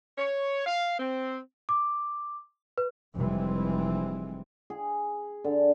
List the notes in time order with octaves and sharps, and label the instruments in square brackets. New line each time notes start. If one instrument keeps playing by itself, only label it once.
[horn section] C#5
F5
C4
[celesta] D6
B4
[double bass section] F1 E3 G3 G#3 C4
[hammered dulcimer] G#4
D3